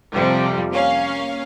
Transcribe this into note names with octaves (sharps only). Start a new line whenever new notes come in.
F2 C3 F3 G3
A#3 C#4 F5